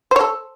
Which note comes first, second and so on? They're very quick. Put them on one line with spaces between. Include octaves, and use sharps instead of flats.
C5 C#5 A4